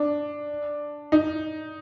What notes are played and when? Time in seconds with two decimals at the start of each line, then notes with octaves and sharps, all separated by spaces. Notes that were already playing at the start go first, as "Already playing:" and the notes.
Already playing: D4
1.12 D#4